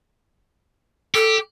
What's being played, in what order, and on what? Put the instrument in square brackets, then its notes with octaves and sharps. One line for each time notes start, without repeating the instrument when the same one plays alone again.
[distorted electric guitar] G4 [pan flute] A4